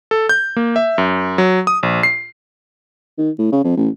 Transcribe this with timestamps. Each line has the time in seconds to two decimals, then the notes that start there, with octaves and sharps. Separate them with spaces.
0.11 A4
0.29 G6
0.56 A#3
0.76 E5
0.98 F#2
1.38 F#3
1.67 D#6
1.83 A#1
2.03 C7
3.18 D#3
3.38 A2
3.52 C#3
3.64 F2
3.77 A1